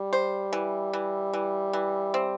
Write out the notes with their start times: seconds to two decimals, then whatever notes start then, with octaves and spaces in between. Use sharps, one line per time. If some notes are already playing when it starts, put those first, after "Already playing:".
Already playing: G3
0.13 C5
0.53 E3
0.93 E3
1.33 E3
1.73 E3
2.14 C4